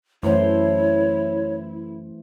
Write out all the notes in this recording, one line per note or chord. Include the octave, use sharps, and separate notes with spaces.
F#2 E3 A3 E4 C5 C#5